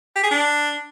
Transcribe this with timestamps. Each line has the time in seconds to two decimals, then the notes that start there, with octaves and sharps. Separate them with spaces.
0.16 G4
0.23 G#4
0.31 D4